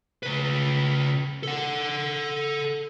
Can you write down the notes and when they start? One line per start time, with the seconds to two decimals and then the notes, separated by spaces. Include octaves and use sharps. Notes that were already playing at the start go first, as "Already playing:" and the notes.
0.23 C#3 B4
1.43 A4 F#5